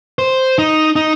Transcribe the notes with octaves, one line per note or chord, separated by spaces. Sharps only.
C5
D#4
D#4